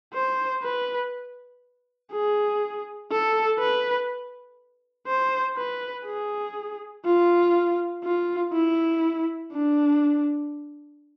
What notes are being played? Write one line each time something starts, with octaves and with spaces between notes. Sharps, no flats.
C5
B4
G#4
A4
B4
C5
B4
G#4
F4
F4
E4
D4